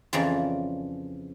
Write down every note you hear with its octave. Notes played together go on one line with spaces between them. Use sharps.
F2 C#3 E3 F3 D5 A#5